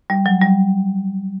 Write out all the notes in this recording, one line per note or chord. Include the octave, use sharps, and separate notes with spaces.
G3
F#3
G3